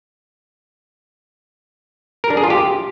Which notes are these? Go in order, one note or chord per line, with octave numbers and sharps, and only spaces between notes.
A#4
D4
G#4
F4
G4